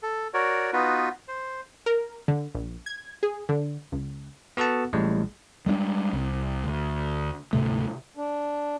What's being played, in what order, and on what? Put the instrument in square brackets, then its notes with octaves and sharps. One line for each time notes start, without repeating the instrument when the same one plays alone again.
[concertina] A4
F#4 A#4 C#5 D5
B3 D#4 F4 F#4 B4
C5
[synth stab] A#4
D3
A#1
G#6
G#4
D3
C#2
[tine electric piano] B3 F#4 A4 F#5 A5
A1 A2 G3 G#3
[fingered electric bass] G3 G#3 B3 D4
C2
D2
D2 G#2 C3 A3
[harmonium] D4